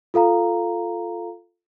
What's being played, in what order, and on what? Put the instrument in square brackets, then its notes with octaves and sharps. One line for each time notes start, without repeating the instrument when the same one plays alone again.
[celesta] F4 A4 F5 A#5